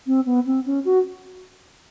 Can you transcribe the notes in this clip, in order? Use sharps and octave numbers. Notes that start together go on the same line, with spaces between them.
C4
B3
C4
C#4
F#4